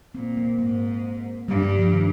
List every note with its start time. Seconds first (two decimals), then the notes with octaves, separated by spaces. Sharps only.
0.15 A#2 C4
0.37 A#3
0.59 G#2 A#3
1.48 G2 G3
1.63 G3
1.79 F3
1.93 D#3